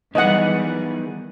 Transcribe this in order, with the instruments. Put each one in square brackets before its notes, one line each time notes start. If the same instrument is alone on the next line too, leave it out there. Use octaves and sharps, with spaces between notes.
[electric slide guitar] D#3 B3 G#4 [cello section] E3 F#3 G3 [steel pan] D#5 F#5